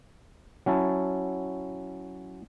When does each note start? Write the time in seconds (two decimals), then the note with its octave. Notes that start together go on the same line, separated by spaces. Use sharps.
0.66 F#3 C#4 E4 A5